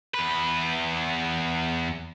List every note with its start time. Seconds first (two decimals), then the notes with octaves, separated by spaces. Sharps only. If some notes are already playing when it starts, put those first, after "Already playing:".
0.14 E2 B4